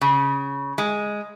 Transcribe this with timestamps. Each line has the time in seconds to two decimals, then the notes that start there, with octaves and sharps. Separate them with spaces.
0.01 C#3
0.78 G#3